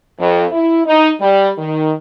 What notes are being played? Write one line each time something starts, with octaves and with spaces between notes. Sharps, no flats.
F2
E4
D#4
G3
D#3